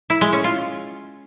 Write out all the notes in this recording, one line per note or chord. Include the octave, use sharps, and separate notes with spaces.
E4
G#3
C#4
F4